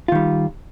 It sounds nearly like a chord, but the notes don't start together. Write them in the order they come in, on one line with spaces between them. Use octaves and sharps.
F4 D#3 G3